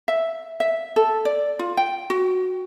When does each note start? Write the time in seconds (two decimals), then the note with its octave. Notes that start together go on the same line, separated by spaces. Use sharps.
0.08 E5
0.60 E5
0.96 A4
1.25 D5
1.59 F4
1.77 G5
2.10 F#4